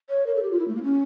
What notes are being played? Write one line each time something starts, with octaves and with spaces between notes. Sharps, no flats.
C#5
A#4
A4
G4
F4
E4
A3
A#3
C#4